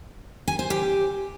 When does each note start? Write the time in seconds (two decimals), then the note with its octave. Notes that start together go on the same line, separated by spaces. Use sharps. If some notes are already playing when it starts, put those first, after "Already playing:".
0.48 G#5
0.59 C5
0.70 G4